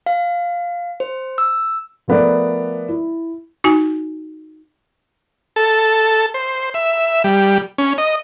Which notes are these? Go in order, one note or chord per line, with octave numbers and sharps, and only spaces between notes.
F5
C5
E6
F3 A3 B3 A#4 D5
E4
D#4 F#4 G#5
A4
C5
E5
G3
C#4
D#5